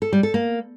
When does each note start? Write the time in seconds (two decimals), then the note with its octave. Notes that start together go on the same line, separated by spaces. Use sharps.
0.02 A4
0.12 G3
0.23 A4
0.34 A#3